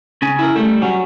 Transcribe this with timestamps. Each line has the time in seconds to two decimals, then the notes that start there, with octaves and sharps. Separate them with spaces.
0.22 C#3 C#4 G#5
0.39 E4 A#4
0.56 G3 A3
0.82 F#3 C#4